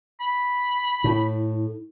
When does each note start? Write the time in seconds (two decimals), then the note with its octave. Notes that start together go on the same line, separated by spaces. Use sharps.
0.20 B5
1.04 A2 E4